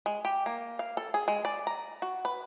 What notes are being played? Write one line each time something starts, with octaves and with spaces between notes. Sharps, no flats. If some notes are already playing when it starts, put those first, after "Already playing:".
G#3
G4
A#3
F5
A4
G#4
G#3
D5
A#5
F#4
B4